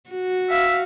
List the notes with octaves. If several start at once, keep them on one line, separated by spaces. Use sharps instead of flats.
F#4
E5 F5